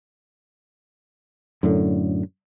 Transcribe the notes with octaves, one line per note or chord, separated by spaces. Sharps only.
F#2 A2 D3